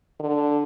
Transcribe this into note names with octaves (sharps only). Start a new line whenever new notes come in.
D3